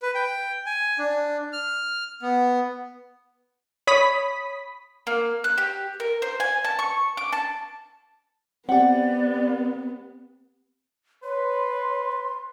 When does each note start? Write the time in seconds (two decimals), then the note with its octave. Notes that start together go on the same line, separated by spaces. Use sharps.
0.02 B4
0.15 G5
0.66 G#5
0.99 D4
1.53 F6
2.22 B3
3.87 C#5 B5 D#6 B6
5.07 A#3
5.44 F#6
5.58 G4
6.00 A#4
6.22 C5
6.40 G#5
6.64 A5
6.79 C#6
7.17 D6
7.33 A5
8.69 B3 C4 G4 D5 F#5
11.23 B4 C#5 C6